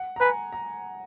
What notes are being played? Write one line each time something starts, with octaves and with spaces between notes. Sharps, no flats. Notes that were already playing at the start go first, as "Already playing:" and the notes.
Already playing: F#5
A#5
B4 G#5
A#5